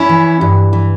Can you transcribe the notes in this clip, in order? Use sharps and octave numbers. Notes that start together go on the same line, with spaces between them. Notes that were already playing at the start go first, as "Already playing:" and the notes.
Already playing: C#4 E4
E3
G2
E3